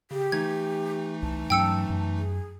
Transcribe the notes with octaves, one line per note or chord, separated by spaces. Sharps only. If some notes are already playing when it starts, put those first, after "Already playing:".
C#3 G4
E3 A3 D#4 G#6
C2 A5
G2 F#3 C#4 G5 E6 C#7
F#2
G#4